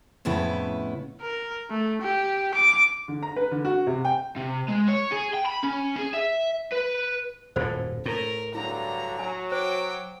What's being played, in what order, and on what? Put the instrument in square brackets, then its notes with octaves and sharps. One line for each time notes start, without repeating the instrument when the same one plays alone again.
[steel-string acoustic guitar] F2 A2 C#3 B3 E4
[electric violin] A#4
A3
G4
D6
[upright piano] D3
A#5
B4
D3
F#4
C3
G5
[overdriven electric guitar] C3
G#3
C#5
G#4
G5
B5
C#4
G#4
E5
B4
[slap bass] D#1 F#2 A2 [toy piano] C5
[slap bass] A2 [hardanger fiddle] A#4
[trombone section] G2 D3 F#3 [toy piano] E4 [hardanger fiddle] A#5
[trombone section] F#3 [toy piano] G#5
[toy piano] C5 [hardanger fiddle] G5 D6